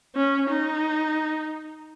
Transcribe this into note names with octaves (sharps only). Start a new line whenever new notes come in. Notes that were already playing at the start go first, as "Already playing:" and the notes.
C#4
D#4